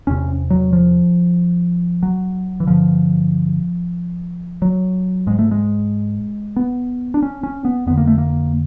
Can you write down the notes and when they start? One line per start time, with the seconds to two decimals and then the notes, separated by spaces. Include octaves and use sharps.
0.07 E2 C3 C#4
0.50 F#3
0.73 F3
2.03 F#3
2.60 E3
2.67 G2 D3 F3
4.62 F#3
5.27 G#2 G#3
5.39 A3
5.51 G#3
6.56 B3
7.14 D4
7.22 C#4
7.43 C#4
7.65 B3
7.87 F2 D3 B3
7.97 A#3
8.07 A3
8.18 A#3